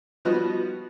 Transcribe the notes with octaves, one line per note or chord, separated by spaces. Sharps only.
F3 G3 B3 D#4 F#4